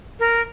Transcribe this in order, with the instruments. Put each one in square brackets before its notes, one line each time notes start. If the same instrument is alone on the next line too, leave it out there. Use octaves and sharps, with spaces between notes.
[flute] A#4